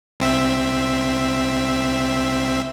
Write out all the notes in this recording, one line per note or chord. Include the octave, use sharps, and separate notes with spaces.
C2 C4 E5